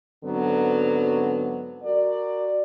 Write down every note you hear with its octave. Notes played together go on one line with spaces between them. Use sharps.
G#2 D3 F#3 B3 C4
F#4 A#4 D5